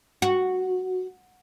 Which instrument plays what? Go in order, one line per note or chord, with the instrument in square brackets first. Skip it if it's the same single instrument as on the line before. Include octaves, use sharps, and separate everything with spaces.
[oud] F#4